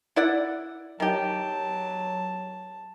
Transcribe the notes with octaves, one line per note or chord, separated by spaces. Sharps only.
E4 D5 F#5
D#3 F#3 G4 A5